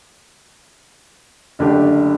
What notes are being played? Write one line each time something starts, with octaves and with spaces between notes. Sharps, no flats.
F#1 D3 A3 G4